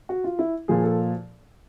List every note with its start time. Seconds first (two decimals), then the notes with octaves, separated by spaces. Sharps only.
0.09 F#4
0.24 F4
0.39 E4
0.68 A#2 F3 G#4
0.84 A4